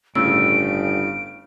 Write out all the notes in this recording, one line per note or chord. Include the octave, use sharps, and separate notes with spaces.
G1 A2 C#3 E6 D7